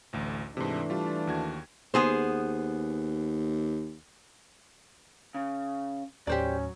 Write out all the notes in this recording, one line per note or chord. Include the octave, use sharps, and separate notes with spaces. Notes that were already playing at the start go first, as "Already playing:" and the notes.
A1 D2
G#2 C3 E3 A3 D4
G3 F4
D#2 F#4 G#6
D#2 B3 G#4 C5
C#3
D#2 A2 F#3 C#4 G4 C5 D5